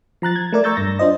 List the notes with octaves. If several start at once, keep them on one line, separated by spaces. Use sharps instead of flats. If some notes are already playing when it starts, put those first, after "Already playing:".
F3 A#5 F#6 A6
G#6
A3 A#4 D5
A#5 C#6 E6 G6 A6
G2 A#6
D4 F4 C5 D#5